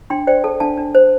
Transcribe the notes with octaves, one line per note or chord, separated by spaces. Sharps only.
D4 G5 C6
C5 D5 G5
A4 F5 A5
D4 F5 A5
D4
C5